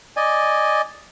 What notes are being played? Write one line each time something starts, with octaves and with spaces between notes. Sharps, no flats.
D5 D#5 G#5